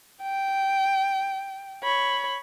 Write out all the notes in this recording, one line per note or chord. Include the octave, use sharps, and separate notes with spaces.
G5
C#5 B5